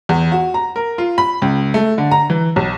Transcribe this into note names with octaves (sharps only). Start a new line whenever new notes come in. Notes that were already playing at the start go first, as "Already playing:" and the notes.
E2
F#4
A#5
A#4
F4
B5
C#2
A3
D3
A#5
E3
B1